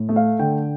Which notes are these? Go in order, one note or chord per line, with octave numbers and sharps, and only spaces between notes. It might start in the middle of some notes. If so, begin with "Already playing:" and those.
Already playing: A2
A3
F5
D3 G5